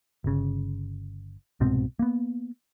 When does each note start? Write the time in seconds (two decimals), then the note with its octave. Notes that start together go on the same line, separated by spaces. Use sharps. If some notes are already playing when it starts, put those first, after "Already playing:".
0.24 G1 C#3
1.60 C2 G#2 B2 C4
1.99 A#3 B3